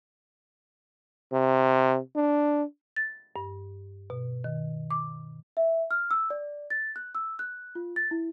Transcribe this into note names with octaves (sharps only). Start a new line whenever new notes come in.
C3
D4
A6
G2
B2
D#3
D6
E5
F6
E6
D5
A6
F#6
E6
F#6
F4
A6
E4